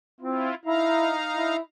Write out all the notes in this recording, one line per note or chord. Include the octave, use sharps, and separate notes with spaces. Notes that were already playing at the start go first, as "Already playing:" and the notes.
C4 E4 F4
D#4 E4 F5 A#5
E4